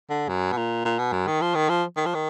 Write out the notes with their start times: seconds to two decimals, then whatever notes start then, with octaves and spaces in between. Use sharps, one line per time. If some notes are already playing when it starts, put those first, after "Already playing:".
0.10 D3
0.28 F#2
0.52 B2
0.57 A#2
0.85 A#2
0.99 B2
1.12 F#2
1.27 D#3
1.41 F3
1.55 D#3
1.69 F3
1.96 D#3
2.06 F3
2.14 D#3